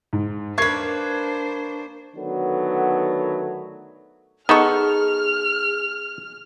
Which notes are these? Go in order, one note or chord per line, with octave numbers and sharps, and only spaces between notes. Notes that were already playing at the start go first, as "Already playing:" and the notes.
G#2
A#3 D4 B4 C5 C#6 G#6 C7
D3 D#3 F#3 A3 B3
B3 D#4 G#4 A4 C#6 F6